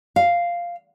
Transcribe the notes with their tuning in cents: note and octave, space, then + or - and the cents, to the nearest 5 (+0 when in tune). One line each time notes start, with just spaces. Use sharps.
F5 -5